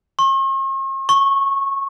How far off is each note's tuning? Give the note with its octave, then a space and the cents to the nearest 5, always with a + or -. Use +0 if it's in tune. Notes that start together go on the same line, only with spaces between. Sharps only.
C#6 -45
C#6 -15